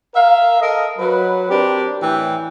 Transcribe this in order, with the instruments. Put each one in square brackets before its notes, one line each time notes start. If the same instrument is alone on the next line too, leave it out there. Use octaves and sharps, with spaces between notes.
[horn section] A#4 E5 F5
A4 A#4 D#5
F#3 B4
C4 D4 G4 A#4
A2 E3 G5